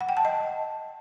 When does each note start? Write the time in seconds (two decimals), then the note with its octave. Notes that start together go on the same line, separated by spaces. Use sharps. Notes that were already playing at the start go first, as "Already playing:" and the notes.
0.01 F#5
0.09 G5
0.17 A5
0.25 D#5